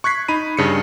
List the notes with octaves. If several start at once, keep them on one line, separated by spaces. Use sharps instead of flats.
C#6 F#6 G#6 B6 C7
D#4 B5 D#7
G2 C#3 C#7